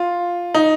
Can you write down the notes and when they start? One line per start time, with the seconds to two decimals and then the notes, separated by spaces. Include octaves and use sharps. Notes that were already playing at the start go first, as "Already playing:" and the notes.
Already playing: F4
0.54 D#4